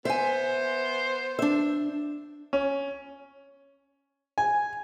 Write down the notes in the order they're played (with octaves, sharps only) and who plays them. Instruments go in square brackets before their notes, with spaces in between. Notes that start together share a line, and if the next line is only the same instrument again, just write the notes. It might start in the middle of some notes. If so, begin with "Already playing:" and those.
[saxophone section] B3 C5 [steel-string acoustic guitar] E5 G#5
[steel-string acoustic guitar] D4 E5
[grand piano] C#4
[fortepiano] G#5